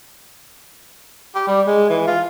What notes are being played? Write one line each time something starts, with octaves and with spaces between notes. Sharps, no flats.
G4
G3
G#3
E3
F4